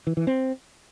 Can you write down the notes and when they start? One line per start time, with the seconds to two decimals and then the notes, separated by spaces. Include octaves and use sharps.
0.07 E3
0.17 E3
0.27 C4